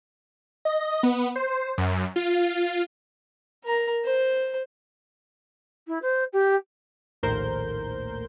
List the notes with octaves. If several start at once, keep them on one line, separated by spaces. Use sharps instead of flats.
D#5
B3
C5
F#2
F4
A#4 A#5
C5
E4
C5
G4
A#1 D#2 A2 A#4 C5 G6